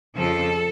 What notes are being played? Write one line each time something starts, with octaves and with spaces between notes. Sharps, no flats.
F2 C#3 F3 A4